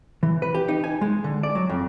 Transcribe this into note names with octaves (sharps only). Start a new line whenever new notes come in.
E3
B4
G4
D#4
G#5
G#3
D3
D5
F#3
F2